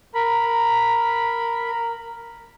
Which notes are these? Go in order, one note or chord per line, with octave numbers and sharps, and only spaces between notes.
A#4 B5